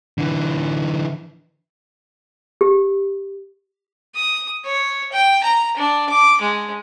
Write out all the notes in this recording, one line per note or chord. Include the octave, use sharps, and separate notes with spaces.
D3 E3
G4
D#6
C#5
G5
A#5
D4
D6
G#3